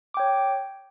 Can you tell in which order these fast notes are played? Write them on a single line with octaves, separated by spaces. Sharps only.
D6 G5 C#5